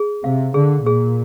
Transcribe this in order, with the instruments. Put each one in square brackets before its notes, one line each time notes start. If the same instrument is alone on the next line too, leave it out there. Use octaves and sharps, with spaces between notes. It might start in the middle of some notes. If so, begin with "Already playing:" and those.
Already playing: [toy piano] G#4
[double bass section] C3 [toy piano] F5
[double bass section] D3 [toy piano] G#4
[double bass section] A#2 [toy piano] G#4